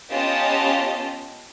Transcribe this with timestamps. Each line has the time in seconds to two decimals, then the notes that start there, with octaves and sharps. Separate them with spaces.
0.11 B3 C#4 F4 G4 D#5 A5